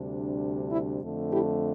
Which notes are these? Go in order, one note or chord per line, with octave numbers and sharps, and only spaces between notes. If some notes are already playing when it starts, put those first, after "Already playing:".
Already playing: D2 C3 G3 D4
E4
F2 D3 A3
E4 G4